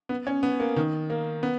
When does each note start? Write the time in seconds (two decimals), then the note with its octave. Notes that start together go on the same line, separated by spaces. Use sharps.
0.09 B3
0.27 C#4
0.43 B3
0.60 A#3
0.76 D#3
1.10 A#3
1.43 B3